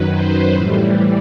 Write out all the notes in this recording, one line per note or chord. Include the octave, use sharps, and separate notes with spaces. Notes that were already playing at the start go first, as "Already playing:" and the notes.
Already playing: F#2 D#3 F#3 B4
C5
A2 E3 G3